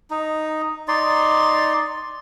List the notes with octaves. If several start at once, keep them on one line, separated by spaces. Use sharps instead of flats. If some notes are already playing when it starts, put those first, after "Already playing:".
D#4
D#4 D5 C6